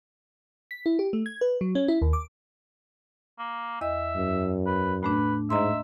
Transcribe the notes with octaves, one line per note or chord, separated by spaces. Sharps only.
B6
E4
G4
A3
G#6
B4
F#3
C#4
E4
D#2
D6
A#3
E2 D#5 E5
F#2
B4
A2 A3 D4 B4
G#2 D#5 E5 A#5 C6